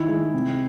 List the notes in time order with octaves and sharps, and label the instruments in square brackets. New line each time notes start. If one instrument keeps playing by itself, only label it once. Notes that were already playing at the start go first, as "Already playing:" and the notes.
Already playing: [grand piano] D#3 E4
G#3
C3